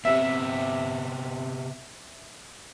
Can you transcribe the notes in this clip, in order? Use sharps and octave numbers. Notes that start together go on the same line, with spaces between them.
C3 B3 C4 E5